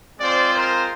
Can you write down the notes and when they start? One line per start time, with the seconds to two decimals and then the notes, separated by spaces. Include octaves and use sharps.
0.19 G#3 C4 F4 C5 D5
0.53 A#4 C5